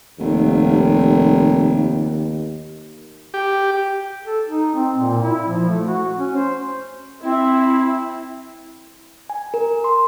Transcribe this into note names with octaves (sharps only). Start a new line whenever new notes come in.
F1 D#2
G4
A4
D#4
C4
A#2
E4
F3
A3
F#4
C#4
C5
C4 E4
G#5
A#4
C6